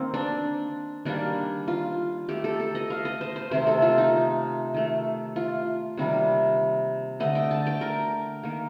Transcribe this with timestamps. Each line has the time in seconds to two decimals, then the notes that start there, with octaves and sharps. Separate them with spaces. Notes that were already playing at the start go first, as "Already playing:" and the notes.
Already playing: D#3 A#3 C4
0.14 D4
1.05 D#3 G3 A#3 D4
1.68 F4
2.29 D#3 A3 G4
2.44 A4
2.60 A4
2.75 D#5
2.90 F5
3.05 D#5
3.21 C5
3.36 C5
3.51 C3 D#3 A3 C5
3.67 A4
3.82 F4
3.98 D#4
4.74 D#3 A3
5.36 F4
5.97 C3 D#3 G3 A#3
7.20 D3 A3 D#5
7.35 G5
7.51 A5
7.67 G5
7.81 A#4
8.43 D#3 A#3